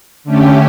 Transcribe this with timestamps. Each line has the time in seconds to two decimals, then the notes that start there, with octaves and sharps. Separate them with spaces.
0.24 D3 A3 C#4 G4